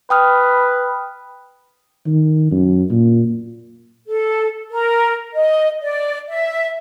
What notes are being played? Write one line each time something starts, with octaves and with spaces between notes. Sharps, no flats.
B4 G5 D#6 F6
D#3
F#2
A#2
A4
A#4
D#5
D5
E5